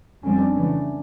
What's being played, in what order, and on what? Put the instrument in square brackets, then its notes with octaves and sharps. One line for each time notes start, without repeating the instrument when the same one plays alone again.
[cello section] F2 D3 G3 C4 [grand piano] C#4
[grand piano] D4
[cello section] C#3 E3 A3